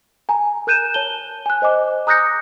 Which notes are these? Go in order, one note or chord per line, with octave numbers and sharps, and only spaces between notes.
G#5 A#5
A#4 F#6 G6 D#7 E7
C#5 A5 G7
G#5 F#6
C5 D#5 G#5 D6
A#5 D#6 F#6 G6 A#6 C#7